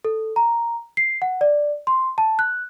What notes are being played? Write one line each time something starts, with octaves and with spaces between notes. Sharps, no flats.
A4
A#5
C7
F#5
D5
C6
A5
F#6